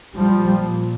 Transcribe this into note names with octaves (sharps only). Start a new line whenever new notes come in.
A#2 F3 G3